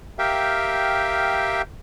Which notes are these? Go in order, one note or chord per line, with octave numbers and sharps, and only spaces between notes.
G4 A#4 E5 F5 G5